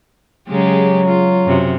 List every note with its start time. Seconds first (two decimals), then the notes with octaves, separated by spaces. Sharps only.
0.49 C#3 F#3 G#3 G4
1.07 F4
1.46 F#2 C3